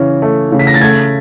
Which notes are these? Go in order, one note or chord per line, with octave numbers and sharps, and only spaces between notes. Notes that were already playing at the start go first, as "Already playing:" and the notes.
Already playing: C#3 E3 C#4
A3
C#3
B6
A#6
A6
A3 G#6